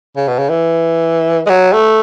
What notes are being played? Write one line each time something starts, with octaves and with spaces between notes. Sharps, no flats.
C#3
B2
C#3
E3
G#3
F#3
A3